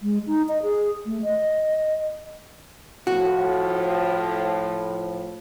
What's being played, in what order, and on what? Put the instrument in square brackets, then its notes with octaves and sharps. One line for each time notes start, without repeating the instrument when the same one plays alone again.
[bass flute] G#3
D#4
D#5
G#4
A3
D#5
[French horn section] A2 F3 [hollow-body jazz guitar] F#4